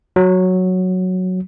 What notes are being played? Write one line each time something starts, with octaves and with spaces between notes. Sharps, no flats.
F#3